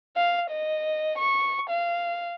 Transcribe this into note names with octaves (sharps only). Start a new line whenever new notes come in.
F5
D#5
C#6
F5